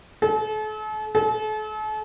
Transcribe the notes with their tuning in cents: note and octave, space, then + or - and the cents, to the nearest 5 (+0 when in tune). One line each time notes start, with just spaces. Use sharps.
A4 -40
A4 -40